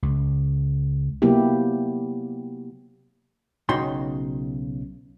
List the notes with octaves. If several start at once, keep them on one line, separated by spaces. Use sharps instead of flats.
C#2
C3 F#3 A#3 B3 E4 G4
B1 C#3 D#4 F#4 G5 C6